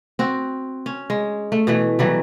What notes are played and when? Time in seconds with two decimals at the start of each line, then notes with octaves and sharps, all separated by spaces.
0.19 C4 F#4
0.86 C#4
1.10 G#3
1.52 A3
1.67 B2 E3 A3
1.99 E3 F#3 G3